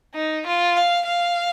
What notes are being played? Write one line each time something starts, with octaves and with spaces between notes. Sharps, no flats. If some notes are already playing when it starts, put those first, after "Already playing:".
D#4
F4
F5
F5